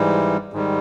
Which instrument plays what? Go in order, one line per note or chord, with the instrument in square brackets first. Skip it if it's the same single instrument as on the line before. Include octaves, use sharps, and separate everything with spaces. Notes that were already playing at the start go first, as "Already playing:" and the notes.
Already playing: [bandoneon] G#2 E3 G3
G#2 D#3 G3